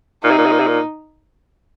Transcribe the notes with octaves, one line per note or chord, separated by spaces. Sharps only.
A#2 D#4
C3
A#2
C3
A#2
C3
A#2